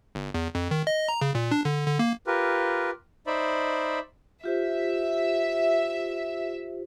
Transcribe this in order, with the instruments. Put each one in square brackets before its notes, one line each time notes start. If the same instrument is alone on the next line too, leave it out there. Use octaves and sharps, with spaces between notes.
[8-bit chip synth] G1
E2
F2
D#3
D#5
A#5
C#3
A#2
D4
D3
D3
A#3
[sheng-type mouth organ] F4 G4 A#4 B4
D#4 C5 D5 E5 B5
[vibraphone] F4 G4 C5 [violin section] E5